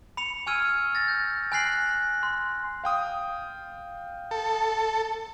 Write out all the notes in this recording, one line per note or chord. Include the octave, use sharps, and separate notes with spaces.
B5 C#7 F7
G#5 C#6 E6 F6 G#6 D#7
A6 A#6
G6
G#5 B5 F#6 A#6 C7 F#7
C6
F5 G5 D#6
A4